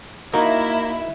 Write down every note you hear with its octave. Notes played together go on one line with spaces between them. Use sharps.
A#3 D#4 E4 F#4 A#4